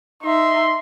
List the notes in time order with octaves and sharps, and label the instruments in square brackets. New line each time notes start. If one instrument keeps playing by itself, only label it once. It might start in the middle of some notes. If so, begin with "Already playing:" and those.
[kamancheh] D#4 E5 [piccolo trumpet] C6